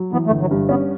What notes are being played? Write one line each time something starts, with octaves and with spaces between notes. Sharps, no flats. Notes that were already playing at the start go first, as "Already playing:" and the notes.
Already playing: F#3
E3 B3
A3
G1
F#3
G2
B3 C#4